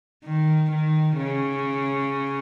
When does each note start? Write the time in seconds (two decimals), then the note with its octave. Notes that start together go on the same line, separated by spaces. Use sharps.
0.25 D#3
0.71 D#3
1.17 C#3